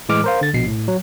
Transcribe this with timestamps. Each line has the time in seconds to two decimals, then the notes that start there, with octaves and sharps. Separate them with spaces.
0.09 A2 E3 G#3 D6 F6
0.24 A#4 C5 F5
0.41 D3 A6
0.53 A#1 B2 C7
0.67 A2
0.88 F#3